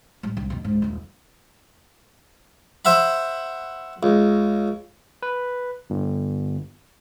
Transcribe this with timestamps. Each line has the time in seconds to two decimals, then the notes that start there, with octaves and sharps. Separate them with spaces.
0.23 A1 G3
0.37 C2
0.50 F2 B2
0.64 C#2 G#2
0.82 D#1 C#2
2.85 C5 E5 F#5 B5
4.03 C#2
5.23 B4
5.90 G1